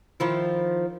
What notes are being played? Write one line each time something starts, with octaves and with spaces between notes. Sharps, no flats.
D#3 F3 E4